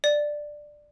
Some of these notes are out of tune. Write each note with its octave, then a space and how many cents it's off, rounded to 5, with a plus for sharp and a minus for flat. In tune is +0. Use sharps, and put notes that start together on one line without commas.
D5 +10